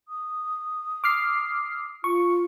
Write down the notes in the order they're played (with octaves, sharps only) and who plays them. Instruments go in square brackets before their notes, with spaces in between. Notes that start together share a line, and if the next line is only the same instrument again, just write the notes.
[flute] D#6
[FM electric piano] D6 F6 C7
[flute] F4 [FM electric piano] C#6